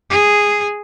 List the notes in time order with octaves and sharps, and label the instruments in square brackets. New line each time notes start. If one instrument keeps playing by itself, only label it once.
[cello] G#4